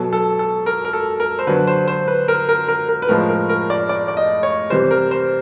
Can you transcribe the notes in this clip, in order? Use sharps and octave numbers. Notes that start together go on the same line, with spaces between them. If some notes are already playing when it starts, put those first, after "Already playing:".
Already playing: B2 F#3 A4
A4
A4
A#4
A#4
A4
A#4
C5
D3 F#3 B4
C5
C5
B4
A#4
A#4
A#4
A#4
B4
A2 F3 G#3 A#4
A#4
A#4
D5
D5
D5
D#5
C#5
C3 E3 G3 C5
A#4
C5